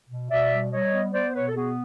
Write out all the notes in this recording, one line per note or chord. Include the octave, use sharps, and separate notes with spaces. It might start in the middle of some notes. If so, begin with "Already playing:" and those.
B2
B2 D5 E5
G3
G3 C#5 D#5
B3
B3 C5 D5
B2 B4 C#5
A4
B3 F#4 G#4